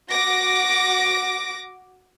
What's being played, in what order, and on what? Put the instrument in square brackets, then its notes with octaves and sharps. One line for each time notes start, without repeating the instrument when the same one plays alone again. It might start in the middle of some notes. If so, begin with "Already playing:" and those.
[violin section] F#4 D6 A#6